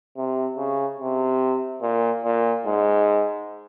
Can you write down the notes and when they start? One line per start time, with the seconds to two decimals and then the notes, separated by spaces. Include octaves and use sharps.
0.17 C3
0.57 C#3
1.00 C3
1.82 A#2
2.24 A#2
2.66 G#2